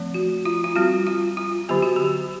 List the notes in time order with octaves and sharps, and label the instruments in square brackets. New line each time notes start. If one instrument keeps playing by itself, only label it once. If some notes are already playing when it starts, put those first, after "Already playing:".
Already playing: [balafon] F3 A3 C4
F#4
F4
F4
G3 C4 F#4
F4
F4
D3 F#3 B3 G4
F#4
G4